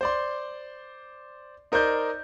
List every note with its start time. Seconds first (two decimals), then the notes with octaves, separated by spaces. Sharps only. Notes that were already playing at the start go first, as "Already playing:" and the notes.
0.01 C5 D5 C6
1.72 D#4 A#4 C5 D5 G6